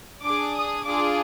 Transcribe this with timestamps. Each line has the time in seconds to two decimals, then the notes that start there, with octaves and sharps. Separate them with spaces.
0.23 D4 G#4 D6
0.54 D#6
0.85 D4 F4 G#4 D6